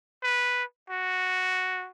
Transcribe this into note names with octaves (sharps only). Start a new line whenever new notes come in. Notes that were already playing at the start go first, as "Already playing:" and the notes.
B4
F#4